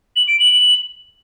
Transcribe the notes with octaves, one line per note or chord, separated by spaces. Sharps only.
F#7
D7
F#7